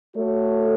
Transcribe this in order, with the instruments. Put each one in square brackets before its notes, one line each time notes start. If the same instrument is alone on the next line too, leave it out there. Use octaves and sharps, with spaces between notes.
[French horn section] A3 F#4 A4 C#5